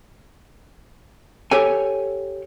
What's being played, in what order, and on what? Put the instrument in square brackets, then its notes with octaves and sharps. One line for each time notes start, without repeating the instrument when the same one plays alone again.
[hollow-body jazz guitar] G4 A4 C#5 G#5